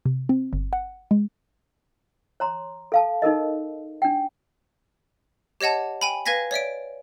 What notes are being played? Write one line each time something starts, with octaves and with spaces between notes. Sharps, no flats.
C3
C4
G1
F#5
G#3
C#5 A#5 C6
A4 F5 A5
D#4 A4 A#4 D#5
D4 G5
G4 C#5 D#5 F#5 A5
G5 G#5 B5
B4 F5 G#5 G#6 A#6 B6
C#5 D5 E5 D7